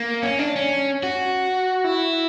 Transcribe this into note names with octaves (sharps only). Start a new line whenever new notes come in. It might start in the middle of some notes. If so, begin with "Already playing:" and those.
Already playing: A#3
C#4
D4
C#4
F#4
E4